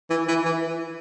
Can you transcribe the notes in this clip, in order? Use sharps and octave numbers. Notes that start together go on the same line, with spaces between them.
E3
E3
E3